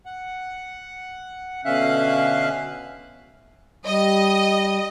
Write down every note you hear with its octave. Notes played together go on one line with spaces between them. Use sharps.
F#5
B2 D3 C#4 E5 F5 F#6
G3 D#5